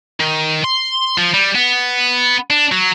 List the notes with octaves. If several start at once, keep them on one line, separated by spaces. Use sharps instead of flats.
D#3
C6
F3
G3
B3
D4
F#3